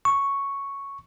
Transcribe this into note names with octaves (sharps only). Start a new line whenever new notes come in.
C#6